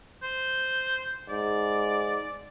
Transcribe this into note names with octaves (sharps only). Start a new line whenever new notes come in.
C5
G#2 D5